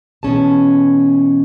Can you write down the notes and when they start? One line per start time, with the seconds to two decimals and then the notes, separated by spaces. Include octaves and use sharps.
0.23 B2 E3 C#4 G#4 A5